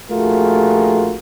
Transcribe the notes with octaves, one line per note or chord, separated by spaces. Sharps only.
A#1 A3 F4 F#4 G#4 A#4